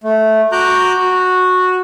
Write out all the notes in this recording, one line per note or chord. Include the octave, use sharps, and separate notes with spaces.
A3
F#4 A#5 D6 F#6 G6
F#4